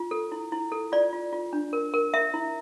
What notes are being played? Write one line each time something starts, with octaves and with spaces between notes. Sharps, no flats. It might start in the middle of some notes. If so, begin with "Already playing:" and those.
Already playing: F4
A4
E4
E4
A4
F4 D5
F4
F4
D4
A#4
A#4
A#4 E5
E4